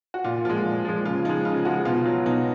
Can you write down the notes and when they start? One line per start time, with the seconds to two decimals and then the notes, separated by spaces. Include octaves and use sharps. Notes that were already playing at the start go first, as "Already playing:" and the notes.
0.14 F#4
0.24 A#2 F4
0.45 F3 G#3 F4
0.65 A#2
0.85 F3 G#3
1.05 C#3 F4
1.25 F3 G#3 D#4
1.45 C#3 F4
1.65 F3 G#3 F#4
1.85 B2 F4
2.05 F#3 F4
2.26 B2 D#4